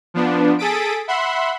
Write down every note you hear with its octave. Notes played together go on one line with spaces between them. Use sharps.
F3 B3 D4
G#4 A4 D#6 A6 B6 D7
E5 F#5 B5 C6